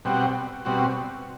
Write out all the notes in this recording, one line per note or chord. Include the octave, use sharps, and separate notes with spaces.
B2 G3 C4 F#4
B2 G3 C4 F#4